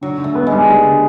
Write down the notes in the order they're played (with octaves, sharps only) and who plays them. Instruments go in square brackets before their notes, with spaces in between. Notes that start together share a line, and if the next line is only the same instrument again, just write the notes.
[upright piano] D3 [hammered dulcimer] F#3
[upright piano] D3
[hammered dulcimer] A3
[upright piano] B3
[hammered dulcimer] G#3
[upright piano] G3
G3
D3